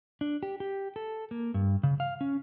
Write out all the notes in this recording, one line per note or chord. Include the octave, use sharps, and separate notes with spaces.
D4
G4
G4
A4
A#3
G2
C#3
F5
C#4